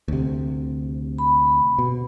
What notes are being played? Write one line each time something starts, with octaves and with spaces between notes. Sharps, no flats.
D2 C3
B5
B2